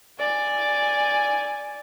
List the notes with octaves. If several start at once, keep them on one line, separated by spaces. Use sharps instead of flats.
D5 G#5